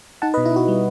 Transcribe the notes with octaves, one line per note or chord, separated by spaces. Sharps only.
D#4 F#5 A5
B4 D#5
B2
E4
D#4 F#4
G3